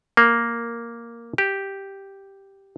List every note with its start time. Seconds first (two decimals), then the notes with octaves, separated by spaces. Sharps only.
0.17 A#3
1.38 G4